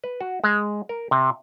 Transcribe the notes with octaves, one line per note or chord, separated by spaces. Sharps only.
B4
F#4
G#3
A#4
C3